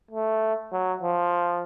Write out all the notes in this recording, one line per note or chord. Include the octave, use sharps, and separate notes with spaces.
A3
F#3
F3